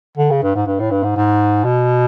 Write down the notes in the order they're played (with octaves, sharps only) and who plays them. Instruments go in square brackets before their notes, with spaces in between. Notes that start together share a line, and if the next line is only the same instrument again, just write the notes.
[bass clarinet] D3
C#3
G2
G#2
G2
A2
G2
G#2
G#2
B2